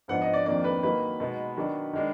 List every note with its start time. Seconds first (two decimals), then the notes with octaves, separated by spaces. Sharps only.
0.08 G#2 F3 B3 D4 F#5
0.22 D#5
0.34 D5
0.45 F2 D#3 A#3 D4 D5
0.64 B4
0.83 D#3 F#3 A#3 D#4 B4
1.20 B2 G#3 B3 D#4
1.57 D#3 F#3 D4
1.93 D#3 G#3 D4